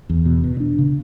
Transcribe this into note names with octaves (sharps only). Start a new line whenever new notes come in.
E2
B2
B2
D4
C#3